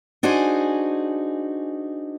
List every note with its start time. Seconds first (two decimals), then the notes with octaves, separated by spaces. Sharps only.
0.23 D4 D#4 F#4 G#4 C5 G#5